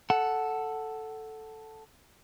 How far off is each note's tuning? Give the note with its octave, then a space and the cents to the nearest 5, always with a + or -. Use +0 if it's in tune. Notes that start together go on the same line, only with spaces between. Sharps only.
A4 +0 F#5 +0